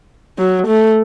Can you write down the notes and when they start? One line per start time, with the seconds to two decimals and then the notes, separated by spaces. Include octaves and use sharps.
0.38 F#3
0.67 A3